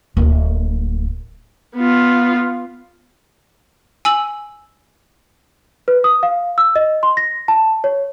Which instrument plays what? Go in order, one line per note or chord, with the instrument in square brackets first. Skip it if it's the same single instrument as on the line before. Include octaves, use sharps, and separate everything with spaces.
[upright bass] D1 A#3
[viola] B3 F4
[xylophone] G#5 E6 F#7
[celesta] B4
D#6
F5
E6
D#5
C6
A#6
A5
C#5